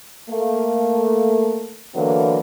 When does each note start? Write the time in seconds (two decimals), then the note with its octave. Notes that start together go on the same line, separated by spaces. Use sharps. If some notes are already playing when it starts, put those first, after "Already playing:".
0.29 A3 A#3
1.94 D3 E3 F#3 A#3 B3